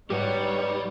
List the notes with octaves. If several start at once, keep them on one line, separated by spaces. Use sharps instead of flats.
G#2 G3 D#4 G4 B4 C#5 D5 F#5